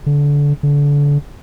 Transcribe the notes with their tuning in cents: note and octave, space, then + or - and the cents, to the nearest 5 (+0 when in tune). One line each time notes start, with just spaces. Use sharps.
D3 -25
D3 -30